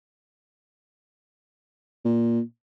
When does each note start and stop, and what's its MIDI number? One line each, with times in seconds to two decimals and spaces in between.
2.05 2.41 46